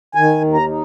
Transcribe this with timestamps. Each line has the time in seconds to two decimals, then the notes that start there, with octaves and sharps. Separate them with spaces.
0.15 D#3 G#5
0.41 D#2
0.54 A#5
0.68 D#4